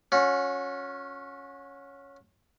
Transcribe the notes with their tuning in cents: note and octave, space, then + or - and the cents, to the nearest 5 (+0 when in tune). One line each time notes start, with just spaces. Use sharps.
C#4 +0 F#4 -30